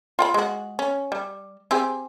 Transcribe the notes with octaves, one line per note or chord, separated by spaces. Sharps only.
F4 G5 B5
G#3 F#4
C#4
G3
C4 G4 G#4